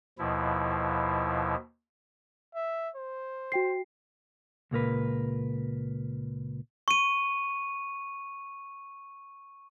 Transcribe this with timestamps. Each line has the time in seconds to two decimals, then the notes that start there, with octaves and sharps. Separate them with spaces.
0.18 D#2 B2 F3 E4
2.55 E5
2.96 C5
3.52 F#4 G5 C7
4.71 C#2 A#2 A#4 B4
6.88 C#6 D#7